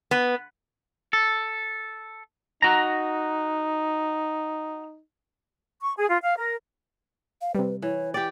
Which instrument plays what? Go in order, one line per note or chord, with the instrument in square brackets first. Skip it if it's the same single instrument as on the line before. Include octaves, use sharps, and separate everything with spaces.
[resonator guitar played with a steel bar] B3
[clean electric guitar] A4
[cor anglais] D#4 [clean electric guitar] F#4 A#5
[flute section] C#6
G#4
F4
F5
A#4
[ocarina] F5
[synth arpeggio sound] C3 G3 [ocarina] B4
[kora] E3 [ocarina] C#5
[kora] G4 D5 [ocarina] G5